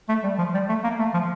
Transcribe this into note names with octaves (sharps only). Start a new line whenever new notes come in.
A3
G3
F3
G3
A3
A#3
A3
F3